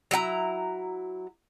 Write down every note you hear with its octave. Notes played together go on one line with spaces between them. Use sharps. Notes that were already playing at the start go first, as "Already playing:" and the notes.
F#3 E4 F#5 A#5